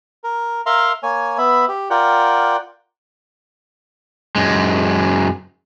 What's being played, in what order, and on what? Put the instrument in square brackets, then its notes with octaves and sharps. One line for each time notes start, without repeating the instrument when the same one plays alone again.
[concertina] A#4
A#4 E5 F5 A#5 C6
A#3 C#5 G#5
B3 E5 B5
G4
F4 A#4 D5 F#5 G5
[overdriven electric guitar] F#2 G#3